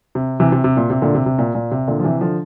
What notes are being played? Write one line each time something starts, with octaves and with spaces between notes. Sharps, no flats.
C3
C3 E3
C3
C3
A#2
C3
A#2 D3
C3
C3
A#2
A#2
C3
A#2 D3
F3
C3 E3
D3 F3